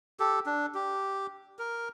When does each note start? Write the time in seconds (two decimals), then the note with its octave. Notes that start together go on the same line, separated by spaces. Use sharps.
0.20 G4 A4
0.46 D4
0.75 G4
1.59 A#4